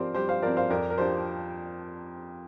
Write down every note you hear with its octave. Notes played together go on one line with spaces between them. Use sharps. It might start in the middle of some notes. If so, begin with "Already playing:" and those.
Already playing: F3 C4 G4 A#4 C5 D5
G2 G4 C5
C5 F5
F3 C4 A#4 D5
C5 F5
F2 A#4 D5
A#4
F3 D4 G4 C5